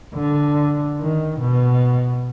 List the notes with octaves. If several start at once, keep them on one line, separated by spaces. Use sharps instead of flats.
D3
D#3
B2